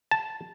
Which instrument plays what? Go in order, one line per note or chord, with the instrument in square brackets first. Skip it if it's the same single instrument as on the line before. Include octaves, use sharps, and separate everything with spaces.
[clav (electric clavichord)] A5